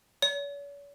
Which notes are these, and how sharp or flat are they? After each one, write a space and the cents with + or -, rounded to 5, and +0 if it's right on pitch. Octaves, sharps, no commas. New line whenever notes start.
C#5 +45